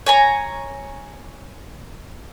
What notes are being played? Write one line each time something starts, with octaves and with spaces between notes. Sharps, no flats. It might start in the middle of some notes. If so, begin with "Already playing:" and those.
C#5 G#5 A#5